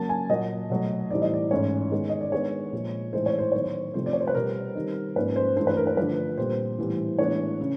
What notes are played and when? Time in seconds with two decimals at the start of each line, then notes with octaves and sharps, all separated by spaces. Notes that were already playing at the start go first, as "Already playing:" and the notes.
Already playing: C#3 F#3 A#3 A5
0.09 G#5
0.29 A#2 F#3 A#3 D#5
0.70 B2 F#3 A3
1.11 A2 E3 G3 C4 D#4 D5
1.22 D#5
1.34 D5
1.51 G#2 E3 A3 C#4 C#5
1.92 D#3 G#3 B3
2.09 D#5
2.21 D5
2.32 D#3 G#3 B3 D4 C#5
2.73 A#2 F3 G#3 C4
3.13 A2 E3 G#3 C4 D#4 C5
3.26 C#5
3.39 C5
3.52 D#3 F#3 B3 C#5
3.64 C5
3.94 C3 F3 A3 C4 C5
4.06 D5
4.13 C#5
4.21 C5
4.27 B4
4.35 B2 G3 C4 A#4
4.75 D#3 G3 C4 D#4
5.16 G#2 F3 A#3 C#4 B4
5.36 C5
5.57 G2 E3 A3 C5
5.67 B4
5.77 A#4
5.87 B4
5.97 D3 F3 A3 D4 B4
6.37 A#2 G3 C4 C5
6.78 A2 E3 G3 B3
7.19 A2 E3 G#3 B3 D4 C#5
7.61 C#3